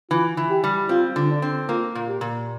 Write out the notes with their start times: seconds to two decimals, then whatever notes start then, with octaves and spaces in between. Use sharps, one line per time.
0.11 E3 F4
0.37 E3
0.50 G4
0.64 G3
0.89 C4 F4
1.16 D3
1.29 D4
1.42 C4
1.69 A#3 F4
1.95 A#2
2.08 G4
2.21 A#2